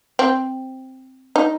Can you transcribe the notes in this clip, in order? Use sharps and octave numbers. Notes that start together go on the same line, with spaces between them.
C4
D#4